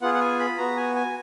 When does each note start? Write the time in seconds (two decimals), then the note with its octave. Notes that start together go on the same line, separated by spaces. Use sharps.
0.02 B3 F4 G#4 F#5
0.14 F#5
0.20 G#5
0.39 B5
0.58 B3 F#4 A#5
0.77 G#5
0.96 G#5